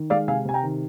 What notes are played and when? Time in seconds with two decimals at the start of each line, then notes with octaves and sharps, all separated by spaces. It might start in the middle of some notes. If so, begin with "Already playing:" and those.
Already playing: D#3
0.10 G#3 D5 F5
0.28 C3 F5 G#5
0.45 C3 G#5
0.54 G5 A#5
0.63 D#3